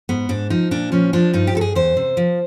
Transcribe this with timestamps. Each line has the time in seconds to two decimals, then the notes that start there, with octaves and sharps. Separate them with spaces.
0.09 G#2 B3
0.29 G#2 D4
0.50 F3 D#4
0.71 A#2 D4
0.92 F3 C#4
1.13 F3 D4
1.33 G2 D#4
1.47 G4
1.55 G2 A4
1.61 G#4
1.75 E2 C5
1.97 C3
2.17 F3